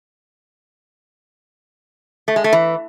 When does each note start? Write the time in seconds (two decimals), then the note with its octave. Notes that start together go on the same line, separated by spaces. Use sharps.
2.28 A3
2.36 G#3
2.44 A3
2.53 E3